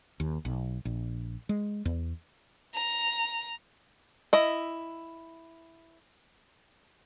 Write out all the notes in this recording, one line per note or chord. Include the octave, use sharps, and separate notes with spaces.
D#2
B1
A#1
G#3
E2
A#5
E4 D#5